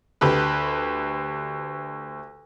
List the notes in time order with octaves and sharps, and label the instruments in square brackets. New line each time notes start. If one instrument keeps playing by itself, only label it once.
[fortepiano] D2 G4 B4